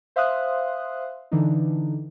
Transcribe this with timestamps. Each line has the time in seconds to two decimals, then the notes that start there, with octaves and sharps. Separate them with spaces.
0.16 C5 E5 F5 C6 D#6 F#6
1.32 D3 E3 D4 D#4